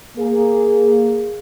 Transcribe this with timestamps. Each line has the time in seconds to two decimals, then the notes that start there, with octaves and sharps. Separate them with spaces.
0.17 A#3 G#4